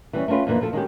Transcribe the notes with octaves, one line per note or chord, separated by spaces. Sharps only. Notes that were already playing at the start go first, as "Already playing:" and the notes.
E3 G3 C#4
A3 C4 C#4 F4 B4
F2 D3 E3 A#3
F3 A4
D#3 G#3 C#4 G4